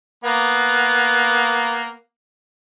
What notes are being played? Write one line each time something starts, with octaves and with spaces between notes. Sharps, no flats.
A#3 B3